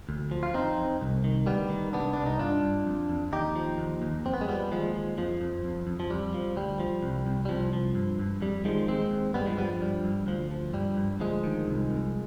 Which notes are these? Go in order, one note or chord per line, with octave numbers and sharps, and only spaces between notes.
D2
F3
F4
F2 C4 D#4
F2
C2
D#3
D2 G3 B3
D#3
C2 B3 D4
C2 D4
D#4
G2 D4 F4
G2
F2
F2
D#2 D#4 G4
F3
D#2
D#2
F2 C4
B3
G#3
F3 G3 B3
D#2 F3 G#3
F3
F2 F3
F2
F2
F2
F3
F2 G3
F3
D2 G3
F3
C2
C2
G3
C2 F3
F3
G2
G2
F2 G3
D#3 F3 G#3
D#2 G#3 C4
D#2
G2 G3 B3
F3 G#3
F3 G3 B3
G2 G3
G2
D2 F3
F3
G2 G3
G2
D2 F3 G#3
D#3
C2
C2